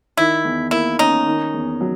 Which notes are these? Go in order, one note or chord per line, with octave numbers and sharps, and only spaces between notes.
D#3 E4
E2
A#3 E4
C#4 D#4
D#3
E2
F#3